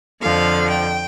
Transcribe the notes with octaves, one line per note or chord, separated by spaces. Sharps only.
F2 D3 F3 F5
G5